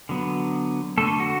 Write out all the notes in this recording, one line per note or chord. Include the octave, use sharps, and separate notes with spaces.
D3 F#3 B3
D3 A3 A4
F#4